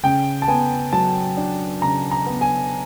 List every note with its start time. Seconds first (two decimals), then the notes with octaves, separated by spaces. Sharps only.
0.03 C#3 G5
0.42 A5
0.48 B3 G#5
0.93 F#3 A5
1.37 D4
1.82 C#3 A#5
2.11 A#5
2.26 B3
2.41 G#5